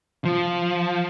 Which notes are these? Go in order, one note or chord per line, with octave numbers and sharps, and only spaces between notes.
F3